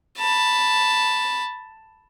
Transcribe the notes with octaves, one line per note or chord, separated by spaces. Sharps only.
A5 B5